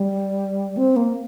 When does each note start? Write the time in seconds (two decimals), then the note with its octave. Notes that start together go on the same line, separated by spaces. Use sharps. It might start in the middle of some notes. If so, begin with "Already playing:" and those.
Already playing: G3
0.77 C4
0.96 A#3